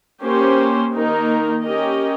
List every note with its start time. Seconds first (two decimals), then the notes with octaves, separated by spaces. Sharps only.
0.24 A#3 C#4 G4 C5
0.94 D#3 A#3 D#4 A#4
1.63 C#4 G4 A#4 D#5